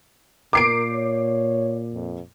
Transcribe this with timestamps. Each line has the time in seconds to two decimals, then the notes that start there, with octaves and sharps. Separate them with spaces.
0.53 A#2 A#4 D6 C7 D7
0.93 C#5
1.94 F2